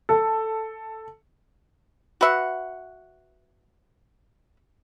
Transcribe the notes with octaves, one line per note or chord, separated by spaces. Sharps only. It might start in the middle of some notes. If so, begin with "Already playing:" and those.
A4
F#4 B4 E5 F#5